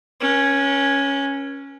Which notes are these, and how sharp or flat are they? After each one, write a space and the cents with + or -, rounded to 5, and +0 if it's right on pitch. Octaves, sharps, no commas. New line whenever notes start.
C#4 +0 B4 -45